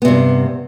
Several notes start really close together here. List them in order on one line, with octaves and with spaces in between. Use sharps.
B3 C3 G2